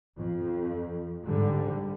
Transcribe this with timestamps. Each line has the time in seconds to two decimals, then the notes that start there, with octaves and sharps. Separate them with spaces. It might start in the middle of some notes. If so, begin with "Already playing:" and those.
0.17 F2
1.25 G#2 D3 G3